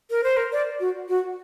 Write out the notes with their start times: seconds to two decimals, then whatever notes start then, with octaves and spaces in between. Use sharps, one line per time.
0.10 A#4
0.24 C5
0.37 A#4
0.52 D5
0.80 F#4
1.09 F#4